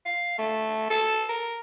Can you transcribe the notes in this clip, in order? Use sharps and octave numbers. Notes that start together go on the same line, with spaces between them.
F5
A3
A4
A#4